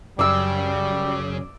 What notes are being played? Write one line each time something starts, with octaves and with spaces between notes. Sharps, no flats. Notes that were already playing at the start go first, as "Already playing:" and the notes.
F#2 C#3 G3 D5 E6